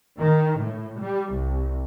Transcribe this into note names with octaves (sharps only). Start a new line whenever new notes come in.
D#3
A2
G3
C2